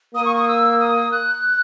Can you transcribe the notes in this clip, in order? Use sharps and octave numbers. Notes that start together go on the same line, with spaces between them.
A#3 D#6
C#6
D#6
E6
D#6
F#6